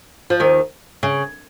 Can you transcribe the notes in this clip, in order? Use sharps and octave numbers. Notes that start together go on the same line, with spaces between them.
F3
D#2 D#3
C#3